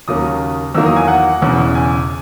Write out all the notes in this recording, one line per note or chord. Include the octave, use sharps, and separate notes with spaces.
D#2 C#3 F#3 A#3 D#6
E2 D#3 F#3 A#3 E6
D#6
G#5
F#5
E1 E2 C#3
G#5